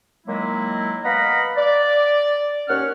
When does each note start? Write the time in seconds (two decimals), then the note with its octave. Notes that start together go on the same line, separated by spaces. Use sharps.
0.27 D#3 F#3 G#3 A#3 E4
1.04 B3 D#5 F5 F#5 A#5 B5
1.57 D5
2.68 D#2 C#4 C#5 F#5 F6